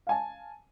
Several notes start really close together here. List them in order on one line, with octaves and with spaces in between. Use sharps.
F5 G#5 A5